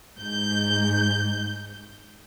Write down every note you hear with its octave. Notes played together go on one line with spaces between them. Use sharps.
G#2 G6